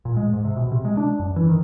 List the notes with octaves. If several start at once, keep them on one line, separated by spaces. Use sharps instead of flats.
A#2
G#3
G#2
C3
B2
C3
G#3
D4
F#2
E3
D#3